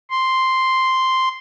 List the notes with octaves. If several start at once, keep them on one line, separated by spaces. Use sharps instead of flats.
C6